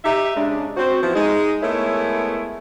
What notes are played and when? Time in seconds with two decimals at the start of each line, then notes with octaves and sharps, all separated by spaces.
0.04 D#4 G4 E5
0.35 C#3 G#3 D4
0.76 C4 F#4 C5
1.02 E3 F3 B3 E4
1.14 G#3 D#4
1.62 G#3 A3 B3 E4 A#4 C#5